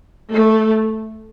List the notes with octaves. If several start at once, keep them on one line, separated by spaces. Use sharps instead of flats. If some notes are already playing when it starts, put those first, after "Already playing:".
A3